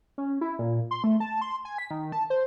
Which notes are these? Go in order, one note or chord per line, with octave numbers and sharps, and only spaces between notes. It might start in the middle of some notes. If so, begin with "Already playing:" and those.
C#4
E4
A#2
C6
A3
A5
C6
G#5
B6
D#3
A5
C5